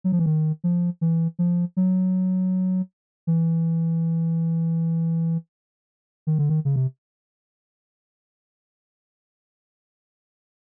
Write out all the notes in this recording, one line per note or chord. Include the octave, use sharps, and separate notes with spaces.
F#3
F3
E3
D#3
F3
E3
F3
F#3
E3
D#3
D3
D#3
C#3
C3